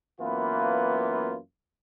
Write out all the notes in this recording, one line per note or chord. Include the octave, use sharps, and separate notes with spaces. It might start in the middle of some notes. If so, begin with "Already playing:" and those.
F#2 E3 A#3 B3 F4 B4